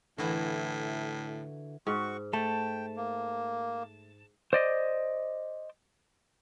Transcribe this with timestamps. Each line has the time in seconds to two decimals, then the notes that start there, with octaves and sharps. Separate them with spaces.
0.18 A2 D3 E3 E4 F#4
1.87 G#2 F#4 C#6
2.33 A3 G5 A5
2.96 A#3
4.53 C5 D5 D#5